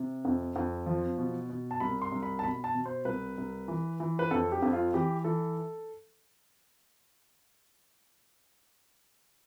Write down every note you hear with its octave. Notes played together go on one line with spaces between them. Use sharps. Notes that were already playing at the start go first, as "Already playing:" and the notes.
Already playing: C3
F2
F2
F3
B2
B2
A5
C2 B5
C6
C2
B5
A5
B2 B5
A5
B2
C5
C2 B4
C2
E3
E3
B4
F2 A4
G4
F2
F4
E3 G4
E3 A4